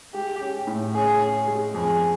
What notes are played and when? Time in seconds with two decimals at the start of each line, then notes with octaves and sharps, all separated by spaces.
0.14 G#3 G4
0.41 C#4
0.67 A2
0.94 C#4 G#4
1.21 C#4
1.47 G#3
1.74 F2 G#4